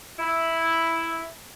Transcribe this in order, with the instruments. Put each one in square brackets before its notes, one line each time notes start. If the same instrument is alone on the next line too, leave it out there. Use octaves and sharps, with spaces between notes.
[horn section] E4